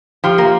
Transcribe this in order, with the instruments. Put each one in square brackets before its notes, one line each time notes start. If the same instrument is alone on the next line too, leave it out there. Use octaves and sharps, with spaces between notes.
[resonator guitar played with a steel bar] F3 [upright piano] G4
[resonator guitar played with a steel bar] A#3